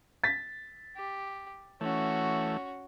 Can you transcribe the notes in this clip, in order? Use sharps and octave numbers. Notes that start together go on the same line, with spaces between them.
A6 B6
G4
E3 A3 C#4 F#4